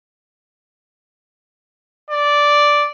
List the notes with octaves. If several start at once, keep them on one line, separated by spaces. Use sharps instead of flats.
D5